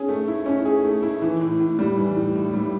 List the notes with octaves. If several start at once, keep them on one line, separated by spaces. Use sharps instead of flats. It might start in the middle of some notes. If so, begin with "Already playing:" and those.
Already playing: C#4 G#4
A3
E4
C#4
G#4
A3
E4
E3
A2
A2
G3
E3
A2
A2
G3